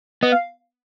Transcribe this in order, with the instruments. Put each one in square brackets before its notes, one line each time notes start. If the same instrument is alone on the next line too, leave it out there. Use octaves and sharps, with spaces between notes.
[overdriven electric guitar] B3 [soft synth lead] D#5
[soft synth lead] F5